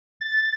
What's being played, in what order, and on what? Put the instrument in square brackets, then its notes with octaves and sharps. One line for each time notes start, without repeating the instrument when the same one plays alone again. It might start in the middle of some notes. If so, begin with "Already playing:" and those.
[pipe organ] A6